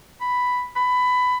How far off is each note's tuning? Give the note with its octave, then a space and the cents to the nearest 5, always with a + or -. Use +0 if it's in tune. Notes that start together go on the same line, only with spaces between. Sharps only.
B5 +5
B5 +15